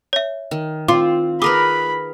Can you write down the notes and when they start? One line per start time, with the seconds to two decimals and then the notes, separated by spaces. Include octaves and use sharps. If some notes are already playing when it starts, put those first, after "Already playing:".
0.13 C#5 E5
0.51 D#3
0.88 C4 F4 D6
1.42 G#4 A#4 B4 B5 D6 D#6